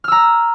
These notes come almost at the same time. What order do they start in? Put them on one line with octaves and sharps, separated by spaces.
F6 E6 A#5